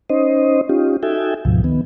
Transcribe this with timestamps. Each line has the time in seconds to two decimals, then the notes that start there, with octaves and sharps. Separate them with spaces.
0.10 C#4 D#4 C5 D#5
0.69 C#4 D#4 F4 G4
1.03 D#4 F#4 A4 E5 G5 G#5
1.45 D2 G#2 B2 F3
1.64 D#3 B3